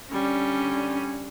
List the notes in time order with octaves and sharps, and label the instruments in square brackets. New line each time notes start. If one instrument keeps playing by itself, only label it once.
[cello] D3 C#4 [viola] G3